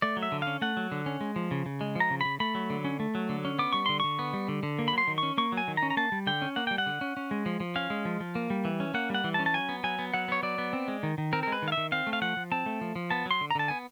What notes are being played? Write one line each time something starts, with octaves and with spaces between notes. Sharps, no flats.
A3 D5
F#3
E5
D3
C#4 F5
A3 F#5
F#3
D3
C#4
G#3
F3
C#3
C#3
G#3
F3 A#5
C#3
C#3 B5
A3 B5
F#3
D3
C#4
A3
F#3
D3
C#4
B3 D6
G3 C#6
D3 C6
D3 C#6
B3
G3
D3
D3
A#3
B5
F#3 C6
D#3
C#4 C#6
A#3 C#6
F#3
G#5
D#3
A#5
C#4
A#5
A#3 A5
G3
D3 G5
C#4
A#3 F#5
G3 G5
F#5
D3
C#4
C#4
G#3
F3
F3
C#4 F5
G#3
F3
F3
A#3
G3
E3
C#4
A#3 F#5
G3 F#5
E3
A5
C#4
A5
F#3 G#5
B3
F#3 G#5
B3
F#3 F#5
B3 C#5
F#3 D5
B3
C4
G#3
D#3
D#3
C4 A#4
A#4
G#3
B4
D#3
F5
E5
D#3
C4 F5
A3
F5
F3 F#5
F3
C4 A5
A3
F3
F3
B3 A5
F#3 C6
D3
A#5
D3 A5
B3 G#5